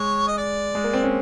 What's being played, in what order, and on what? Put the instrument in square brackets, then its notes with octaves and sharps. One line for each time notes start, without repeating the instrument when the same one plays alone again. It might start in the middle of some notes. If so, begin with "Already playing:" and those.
Already playing: [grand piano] G#3 [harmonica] C#5
[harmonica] D#5
D5
[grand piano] G#3
A#3
C4
C#4